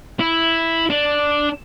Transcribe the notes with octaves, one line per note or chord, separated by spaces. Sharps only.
E4
D4